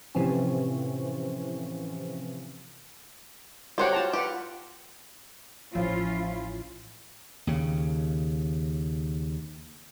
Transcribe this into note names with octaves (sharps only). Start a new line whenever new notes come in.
A2 C3 E3 F3 C4 C#4
F#4 G4 C5 C#5 F#5 G5
F4 A5 A#5
F4 G4 B4 F#5
A1 F3 C#4 E4 F4
D#2 C#3